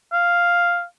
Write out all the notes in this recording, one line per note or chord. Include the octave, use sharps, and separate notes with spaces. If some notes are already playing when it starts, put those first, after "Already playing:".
F5